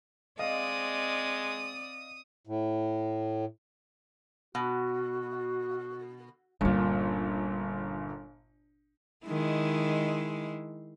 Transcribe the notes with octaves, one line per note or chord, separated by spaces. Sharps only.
G#3 C4 D5 D#5 F5 D#6
A2
B2 F#4
G1 A#2 G3 C#4
D#3 G#3 E4